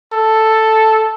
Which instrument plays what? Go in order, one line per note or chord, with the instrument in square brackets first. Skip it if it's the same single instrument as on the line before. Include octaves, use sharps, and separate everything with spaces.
[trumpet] A4